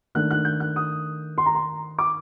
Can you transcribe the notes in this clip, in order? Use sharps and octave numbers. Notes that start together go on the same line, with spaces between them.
D#3 A3 D4 F#6
F#6
G6
F#6
D#6
C6
A#5
C6
D6